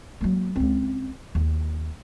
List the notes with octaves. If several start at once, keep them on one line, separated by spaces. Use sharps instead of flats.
F#3 A#3
C#2 C4
D#2